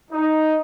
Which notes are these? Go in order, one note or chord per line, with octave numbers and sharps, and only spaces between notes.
D#4